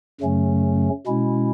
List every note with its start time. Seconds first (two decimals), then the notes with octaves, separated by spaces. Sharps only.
0.21 F#2 C#3 F#3 A3 C#4
1.07 B2 G#3 C#4 E4